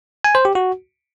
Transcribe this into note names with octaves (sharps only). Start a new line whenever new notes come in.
G#5
C5
G4
F#4